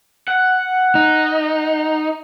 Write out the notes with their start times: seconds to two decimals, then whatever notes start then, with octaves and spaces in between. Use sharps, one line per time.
0.28 F#5
0.95 D#4